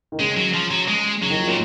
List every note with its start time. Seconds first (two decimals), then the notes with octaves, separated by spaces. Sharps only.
0.12 D#3
0.19 C#3 G#3
0.37 F#3
0.54 F3
0.71 F#3
0.88 G#3
1.21 C#3 F#3
1.30 D#3
1.38 F3
1.47 A#2 F#3